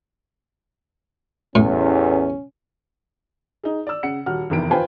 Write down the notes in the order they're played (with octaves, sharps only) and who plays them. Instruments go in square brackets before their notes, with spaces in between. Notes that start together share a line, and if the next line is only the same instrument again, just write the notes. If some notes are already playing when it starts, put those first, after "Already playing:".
[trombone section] A1 E2 [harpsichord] A2 [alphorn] C#4
[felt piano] D#4 G#4
D5 E6
C#3 F#5 C#7
D#1 F#4 F#5 F6
F1 E2 D#3 E3 D7
F4 B4 C5 G5 G#5 B5